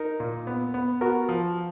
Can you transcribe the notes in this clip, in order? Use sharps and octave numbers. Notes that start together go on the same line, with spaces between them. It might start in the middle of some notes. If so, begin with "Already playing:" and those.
Already playing: D#4 A#4
A#2
B3
B3
B3 F#4 A#4
F3